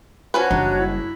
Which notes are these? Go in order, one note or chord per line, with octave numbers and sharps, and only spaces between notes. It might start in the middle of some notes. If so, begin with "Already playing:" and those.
F3 C#4 F#4 B4 C#5
F#1 G3 D4 D#4
E4